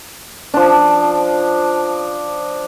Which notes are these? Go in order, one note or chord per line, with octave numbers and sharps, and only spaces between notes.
F3 D4